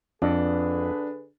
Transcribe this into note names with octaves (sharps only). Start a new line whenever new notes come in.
F2 D3 D4 G#4 B4